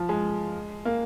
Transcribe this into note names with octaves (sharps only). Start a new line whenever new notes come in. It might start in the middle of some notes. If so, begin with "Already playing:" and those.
Already playing: F3
G#3
A#3